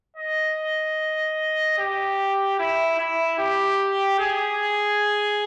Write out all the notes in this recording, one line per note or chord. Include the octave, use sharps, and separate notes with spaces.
D#5
G4
E4
E4
G4
G#4